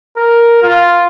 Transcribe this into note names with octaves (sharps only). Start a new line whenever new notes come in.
A#4
F4